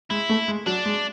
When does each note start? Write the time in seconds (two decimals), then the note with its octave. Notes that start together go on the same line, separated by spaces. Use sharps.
0.10 G#3 E4
0.29 A3
0.48 G#3
0.67 F#3 D4
0.86 G#3